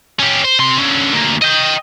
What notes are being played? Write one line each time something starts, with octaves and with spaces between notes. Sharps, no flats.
C#4 G4
C5
C3 C6
D3 C#4
D2 A#3
D#5 G5